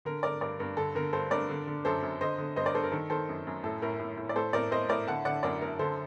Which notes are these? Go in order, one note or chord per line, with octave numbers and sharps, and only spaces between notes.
D3 A#4
D3 A#4 D5
G2 A#4 D5
G2 A#4
D3 A4
D3 A#4
G2 A4 C5
G2 A#4 D5
D3
D3
F#2 A4 C5
F#2
D3 C5 D#5
D3
G2 C5 D#5
A#4 D5
G2 A4 C5
A#4
D#3 A4
D#3 A4 C5
F#2
F#2
A2 A4
A2 A#4
A2
A2
D5
A2 A4 C5
A2 A#4 D5
A2 C5 D#5
A2 A#4 D5
D3 F#5 A5
D3 D5 F#5
F#2 A#4 D5
F#2 A#4
D3 A4 C5